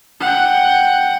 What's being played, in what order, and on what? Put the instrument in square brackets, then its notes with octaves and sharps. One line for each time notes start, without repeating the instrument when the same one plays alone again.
[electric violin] F#5 G5